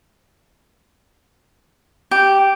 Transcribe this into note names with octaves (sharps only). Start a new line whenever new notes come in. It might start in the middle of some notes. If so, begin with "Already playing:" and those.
G4